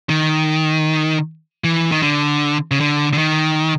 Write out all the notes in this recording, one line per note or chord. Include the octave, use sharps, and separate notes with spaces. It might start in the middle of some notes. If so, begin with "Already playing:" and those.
D#3
E3
D#3
D3
C#3
D3
D3
D#3